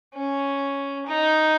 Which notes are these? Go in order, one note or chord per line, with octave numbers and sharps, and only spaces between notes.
C#4
D#4